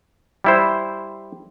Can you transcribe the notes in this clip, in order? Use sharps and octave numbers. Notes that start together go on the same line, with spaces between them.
G3 E4 C5